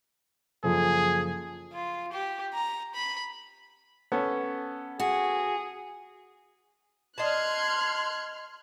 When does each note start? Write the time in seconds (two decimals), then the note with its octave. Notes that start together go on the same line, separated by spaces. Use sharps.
0.64 F#1 F3 G#4 A4
1.73 F4
2.12 G4
2.54 A#5
2.94 B5
4.12 B3 C#4 A4
5.00 F#4 G#4
7.18 D#5 A5 C6 F6 F#6 G#6